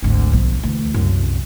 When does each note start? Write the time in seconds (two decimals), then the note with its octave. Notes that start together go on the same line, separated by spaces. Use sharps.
0.02 G#1 D2
0.32 B1 F3
0.63 D2 E3
0.94 C2 F#2